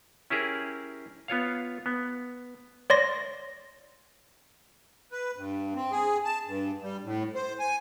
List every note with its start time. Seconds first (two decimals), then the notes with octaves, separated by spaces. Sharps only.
0.30 C#4 E4 G4 G#4 A#4
1.28 B3 F4 C#5 F5
1.86 B3
2.90 C#5 D5 C6 A#6
5.12 B4
5.36 G2
5.75 C4
5.91 G#4
6.25 A5
6.47 G2
6.82 G3
7.03 A2
7.35 C5
7.60 G#5